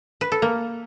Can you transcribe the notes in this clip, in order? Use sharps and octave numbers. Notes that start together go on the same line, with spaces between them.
B4
A4
A#3